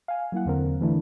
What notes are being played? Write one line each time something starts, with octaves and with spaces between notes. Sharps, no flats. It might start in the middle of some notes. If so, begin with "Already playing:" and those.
F5 G#5
F#3 A#3 E4 F#5
E2 D3 C4 A#4
D3 E3 A3 D4 E4